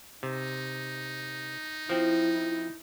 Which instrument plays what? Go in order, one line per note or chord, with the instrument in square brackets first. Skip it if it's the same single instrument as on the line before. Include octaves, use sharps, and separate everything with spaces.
[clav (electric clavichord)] C3 [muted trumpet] D#4
[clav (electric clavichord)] F3 C4 [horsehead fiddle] E4